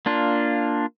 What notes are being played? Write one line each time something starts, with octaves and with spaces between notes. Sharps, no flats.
A#3 D4 F4